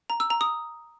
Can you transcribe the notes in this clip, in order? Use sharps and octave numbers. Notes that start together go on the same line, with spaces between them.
A#5
E6
A#5
D#6